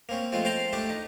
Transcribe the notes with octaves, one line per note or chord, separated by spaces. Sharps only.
A#3 C4 C#4
F3 G#3 A3 C4 F4
C5 G5 A5 A#5 C6
A3 D4 G4 A5
D#4